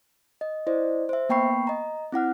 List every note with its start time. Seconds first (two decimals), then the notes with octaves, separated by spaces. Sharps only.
0.41 D#5
0.67 E4 C5 D5 D#5
1.09 C5 E5
1.29 A#3 B3 G5 B5 C#6 C7
1.67 D#5 A#5
2.12 C4 E4 F#5 F6